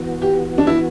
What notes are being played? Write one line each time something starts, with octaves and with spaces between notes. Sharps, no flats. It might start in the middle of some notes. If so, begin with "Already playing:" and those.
Already playing: E3 B3 F#4
G4
D4
E4